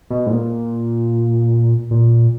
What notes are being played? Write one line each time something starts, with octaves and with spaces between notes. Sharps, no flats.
B2
G#2
A#2
A#2